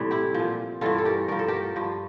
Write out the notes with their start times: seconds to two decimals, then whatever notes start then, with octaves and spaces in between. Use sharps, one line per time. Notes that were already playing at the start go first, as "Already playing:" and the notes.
Already playing: A2 C3 E3 G3 C4
0.11 E4 G4
0.35 A#2 F3
0.81 G2 E3 G3 F4 A4
0.98 A4
1.05 G4 A#4
1.28 G2 F3 A#4
1.39 A4
1.48 G4 A#4
1.76 G2 F3